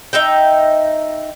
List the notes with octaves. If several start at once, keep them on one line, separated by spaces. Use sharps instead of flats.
D#4 E5 G5